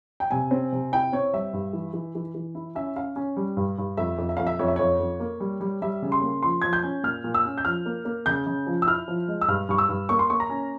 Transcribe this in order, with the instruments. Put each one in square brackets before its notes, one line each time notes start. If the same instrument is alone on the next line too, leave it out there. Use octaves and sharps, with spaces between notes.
[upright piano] G5
C3 G#5
C4
C3
E4 G5
C4 C#5
G3 E5
G2
E3
E3
E3
E3
E4
C#4 E5
C#4 F5
C#4
G3
G2
G2
F2 E5
F2
E5
F2 F5
E5
F2 C#5
E5
F2 C#5
F2
A#3
G3
G3
G3 E5
C#3
C6
A#3
F3 C6
F3 G#6
G6
C#4
A#2 F6
A#2
E6
C#4
G6
F3 F6
A#3
A#3
C#3 G6
C#3
F3
E6
E4 F6
F3
G#3
E6
G2 F6
G2 C#6
E6
G2
A#3 C#6
C6
A#3 C#6
A#5
C#4